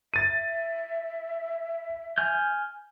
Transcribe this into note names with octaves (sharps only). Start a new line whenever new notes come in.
E5 A6 D#7
G#5 F6 G6